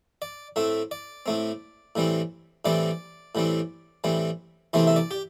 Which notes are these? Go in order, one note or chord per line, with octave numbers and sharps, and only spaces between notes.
D5
A2 A3 C4 E5
D5
A2 A3 C4
A2 E3 G3 C4
A2 E3 G3 C4 D5
A2 E3 G3 C4
A2 E3 G3 C4
E2 C3 E3 A3 C4 C5
E5
D5
G4